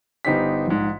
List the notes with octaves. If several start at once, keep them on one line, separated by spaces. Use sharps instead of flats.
G1 B3 D#4 G4 C5 B6
A#1 G#2